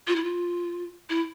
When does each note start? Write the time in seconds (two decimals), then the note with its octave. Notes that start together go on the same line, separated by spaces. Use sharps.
0.08 F4
0.16 E4
0.24 F4
1.10 E4